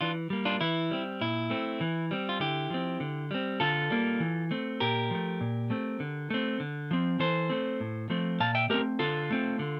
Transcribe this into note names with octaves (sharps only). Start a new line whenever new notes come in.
E3 D4 F4
G3 A#3
D4 F4
E3 E4
G3 C4
A#2 E4
A3 C4
E3
G3 C4
F4
D3 E4 G4
F3 C4
D3
G3 C4
D3 F4 A4
G3 A#3
E3
A3 C4
A#2 G4 A#4
F3 A3
A#2
A3 C4
D3
A3 C4
D3
F3 C4
E3 A4 C5
A3 C4
A2
F3 A3 C4
A#2 F5 A5
E5 G5
A3 C4 G4 A#4
D3 F4 A4
A3 C4
D3